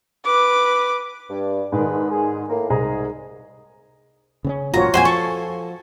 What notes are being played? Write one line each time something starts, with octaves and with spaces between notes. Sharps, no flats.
B4 D6
G2
G#2 D#3 D4 G#4 B4
G#4
A2 A#3
C2 G#2 G#4 A#5
C#3 C4 C#4
A1 F#2 A#2 F4 F#4 C#5 A#5
F2 A#2 C5 G5 G#5
F3 A4 C#6